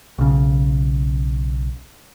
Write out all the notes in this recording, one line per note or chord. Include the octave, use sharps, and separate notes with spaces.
B1 C#3